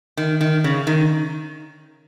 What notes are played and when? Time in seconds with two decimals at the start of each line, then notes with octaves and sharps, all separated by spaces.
0.17 D#3
0.41 D#3
0.64 C#3
0.87 D#3